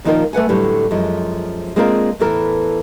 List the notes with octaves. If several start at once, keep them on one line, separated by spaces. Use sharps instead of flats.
A#2 D#3 F3 D#4 F4 A#4
A3 B4 F#5 G#5
A2 D3 F#3 G3
F#2 F3 G#3
G#3 A#3 C4 D4 F4 A#4
E2 A2 E3 A4 A#4